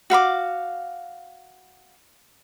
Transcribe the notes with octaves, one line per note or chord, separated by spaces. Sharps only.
F#4 F5 B5 D6